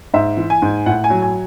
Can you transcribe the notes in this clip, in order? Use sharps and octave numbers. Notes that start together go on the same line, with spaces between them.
G#2 E5
E3
G#5
G#2
A2 F#5
G#5
F#3
G#5